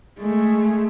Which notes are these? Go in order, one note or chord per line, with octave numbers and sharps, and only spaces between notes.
G#3 A3